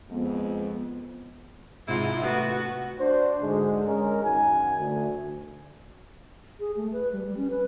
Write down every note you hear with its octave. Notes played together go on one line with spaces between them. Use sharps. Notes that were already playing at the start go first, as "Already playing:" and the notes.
F2 G#3 B3
G#2 C3 E4 F4
A3 B3 F#4
D4 F#4 C5
G#2 D3 G#3
G#3 C#4 A#4
F#2 D#3 F#4 G#5
D2
G#4
A3
B4
G3
G3
C#4
B4